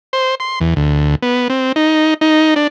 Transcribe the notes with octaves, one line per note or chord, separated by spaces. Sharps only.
C5
C6
E2
D2
B3
C4
D#4
D#4
D4